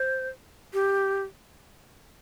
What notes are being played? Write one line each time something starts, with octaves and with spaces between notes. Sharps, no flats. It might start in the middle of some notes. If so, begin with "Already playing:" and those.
Already playing: C5
G4